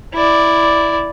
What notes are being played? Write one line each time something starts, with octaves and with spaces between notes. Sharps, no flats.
E4 D5